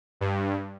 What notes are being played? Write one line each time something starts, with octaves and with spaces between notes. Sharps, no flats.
G2